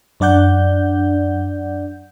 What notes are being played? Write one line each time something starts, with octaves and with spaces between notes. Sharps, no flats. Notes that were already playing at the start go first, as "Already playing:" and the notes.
F#2 D4 D5 F#5 G6